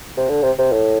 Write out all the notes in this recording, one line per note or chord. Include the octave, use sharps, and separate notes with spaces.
C3
D3
C3
C3
A2